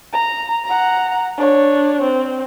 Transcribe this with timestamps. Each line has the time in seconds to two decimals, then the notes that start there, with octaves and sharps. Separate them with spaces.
0.13 A#5
0.65 F#5 A#5
1.37 D4 C#5
2.02 C4